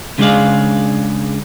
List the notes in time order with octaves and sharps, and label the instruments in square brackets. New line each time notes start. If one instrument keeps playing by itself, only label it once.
[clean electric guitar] C#3 G#3 D4 G#4 F5